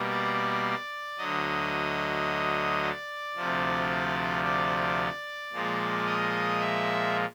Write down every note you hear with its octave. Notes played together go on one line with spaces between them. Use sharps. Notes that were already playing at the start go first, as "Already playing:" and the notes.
Already playing: B2 G3 A#3
D5
D2 D3 F#3 D#5
D5
D2 C3 F3
D5
A#2 F3 G#3
D#5
E5